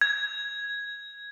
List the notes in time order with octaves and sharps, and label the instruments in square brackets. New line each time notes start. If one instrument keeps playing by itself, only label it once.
[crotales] G#6